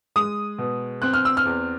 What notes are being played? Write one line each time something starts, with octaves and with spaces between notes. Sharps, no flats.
G#3 D#6
B2
C4 F#6
F6
E6
F6
E2